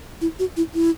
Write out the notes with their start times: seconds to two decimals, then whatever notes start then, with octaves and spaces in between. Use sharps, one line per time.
0.21 E4
0.39 F#4
0.57 E4
0.74 E4